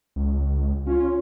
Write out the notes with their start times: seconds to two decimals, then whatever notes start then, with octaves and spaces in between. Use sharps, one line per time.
0.16 C#2
0.87 C#4 F4